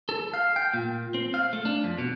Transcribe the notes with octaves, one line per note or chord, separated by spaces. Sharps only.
A4
F5
G5
A#2
C4
F5
A3
D4
F2
B2